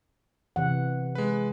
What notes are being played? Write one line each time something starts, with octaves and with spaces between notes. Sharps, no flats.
C3 E3 F#5
G#3 B4